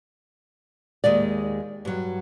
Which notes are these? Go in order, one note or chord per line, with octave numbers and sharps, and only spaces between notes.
D#2 D#3 G#3 D5
G2 F#3